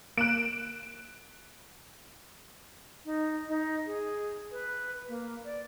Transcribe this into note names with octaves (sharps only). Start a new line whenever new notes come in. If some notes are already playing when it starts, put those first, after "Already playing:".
A#3 F#6 D7 E7
D#4
D#4
G#4
B4
A#3
D5